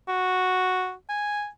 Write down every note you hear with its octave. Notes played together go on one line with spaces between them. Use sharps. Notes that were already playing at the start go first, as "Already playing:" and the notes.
F#4
G#5